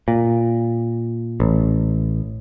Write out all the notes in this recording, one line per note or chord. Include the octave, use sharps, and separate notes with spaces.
A#2
A1